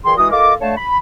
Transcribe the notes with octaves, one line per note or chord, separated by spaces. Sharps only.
A#2 E3 G#4 G5 C6
E3 G#3 F#4 D#6
F4 A4 A#4 D#5 D6
D3 A3 C#5 F5 A5
B5